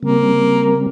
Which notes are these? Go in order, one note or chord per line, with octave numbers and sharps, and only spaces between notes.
C#3 G3 A#3 C4